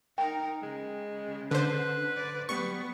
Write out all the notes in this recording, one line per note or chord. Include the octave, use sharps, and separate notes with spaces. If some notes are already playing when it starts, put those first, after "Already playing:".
D#4 A#4 G5
C#3 G#3
D3 B4 C5
D5
F#3 G3 B3 C#6